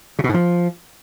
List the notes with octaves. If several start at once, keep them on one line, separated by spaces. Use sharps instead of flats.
C#3
B2
G#2
F3